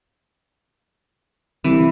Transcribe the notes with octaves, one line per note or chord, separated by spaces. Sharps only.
C2 E3